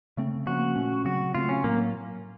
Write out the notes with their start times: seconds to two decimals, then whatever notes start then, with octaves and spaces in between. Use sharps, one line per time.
0.17 C#3 A3 C4
0.46 C#3 F3 A#3 C#4 F#4
0.76 A#2 A3 C#4
1.05 C#3 F#3 C4 F#4
1.35 C#3 A3 C4 F4
1.49 C#4
1.64 A2 F#3 A#3